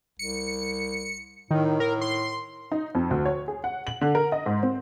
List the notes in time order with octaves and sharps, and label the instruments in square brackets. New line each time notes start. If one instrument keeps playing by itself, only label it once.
[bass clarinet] C2 [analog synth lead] C#7
[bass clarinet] A2 [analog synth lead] D#3
[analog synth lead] A#4
C6
[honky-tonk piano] D#4
F2
D2
C#5
G#4
F#5
F#7
D3
A#4
D#5
G#2
C4